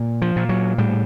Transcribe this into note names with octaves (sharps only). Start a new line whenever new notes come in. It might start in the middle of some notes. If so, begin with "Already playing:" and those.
Already playing: A#2
F3
A#2
F#3
A2 G3